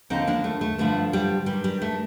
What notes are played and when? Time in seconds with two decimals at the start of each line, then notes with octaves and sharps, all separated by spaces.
0.10 D#2 D3 F3 C4 D#4
0.27 A#3 D4
0.44 A3
0.61 A3
0.78 G2 D3 F3 A3
1.13 G3
1.46 G2 D#3 G3
1.64 G3
1.82 A3